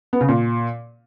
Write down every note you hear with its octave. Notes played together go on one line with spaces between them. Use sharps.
B3
C#3
A#2